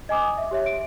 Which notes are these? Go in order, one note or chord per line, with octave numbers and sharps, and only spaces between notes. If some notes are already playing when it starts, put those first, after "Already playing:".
D#5 G#5 D6 D#6
E5
G4 C#5 E5
D7